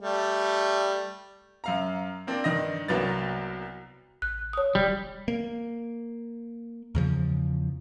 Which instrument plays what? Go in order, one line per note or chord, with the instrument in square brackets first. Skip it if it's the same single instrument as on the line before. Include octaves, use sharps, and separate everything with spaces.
[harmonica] G3 A3
[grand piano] F#2 F5 A#5
A#3 C4 D4
G2 D#3 D#5 A#6
C2 F#3 A#3 B3 A6
[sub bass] A1 [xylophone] F#6
[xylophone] C#5 D#6
[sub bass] D#1 [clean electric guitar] G3
[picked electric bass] A#3
E2 C#3 F3